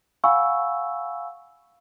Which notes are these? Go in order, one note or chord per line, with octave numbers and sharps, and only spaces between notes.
F5 F#5 G#5 B5 C#6 E6